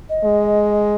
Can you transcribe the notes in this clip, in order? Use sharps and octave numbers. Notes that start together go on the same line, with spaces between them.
D#5
G#3